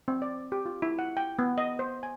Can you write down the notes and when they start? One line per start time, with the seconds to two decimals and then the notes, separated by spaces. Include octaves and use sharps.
0.08 C4
0.22 D5
0.52 G4
0.66 F4
0.82 E4
0.99 F#5
1.17 G5
1.39 B3
1.58 D#5
1.79 C5
2.03 G#5